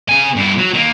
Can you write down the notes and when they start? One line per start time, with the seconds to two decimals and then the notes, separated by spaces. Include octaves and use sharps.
0.09 C#3 G#5
0.36 G2 E4
0.58 F#3
0.74 D#3 A#3